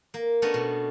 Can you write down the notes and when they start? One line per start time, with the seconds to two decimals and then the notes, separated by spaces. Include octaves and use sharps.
0.14 A#3
0.42 A3 B3 C#4 D4 D#5
0.54 B2